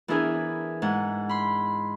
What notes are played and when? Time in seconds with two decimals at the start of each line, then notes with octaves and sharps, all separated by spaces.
0.08 E3 B3 D4 E4 G#4 A#4
0.82 G#2 D4 F#5
1.29 B5 C6